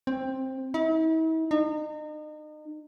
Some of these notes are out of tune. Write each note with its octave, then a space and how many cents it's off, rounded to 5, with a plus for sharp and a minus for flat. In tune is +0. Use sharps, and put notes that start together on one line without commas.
C4 +10
E4 -45
D#4 -35